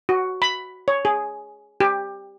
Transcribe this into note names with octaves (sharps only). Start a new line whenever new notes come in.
F#4
B5
C#5
G#4
G4